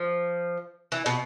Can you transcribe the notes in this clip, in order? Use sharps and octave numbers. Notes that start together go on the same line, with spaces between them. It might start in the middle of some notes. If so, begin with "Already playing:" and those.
Already playing: F3
E3
B2